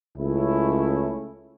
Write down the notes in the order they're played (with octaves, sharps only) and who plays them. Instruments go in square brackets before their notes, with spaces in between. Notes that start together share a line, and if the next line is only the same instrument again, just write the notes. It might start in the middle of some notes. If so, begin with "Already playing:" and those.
[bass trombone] C#2 [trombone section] A3 C#4 E4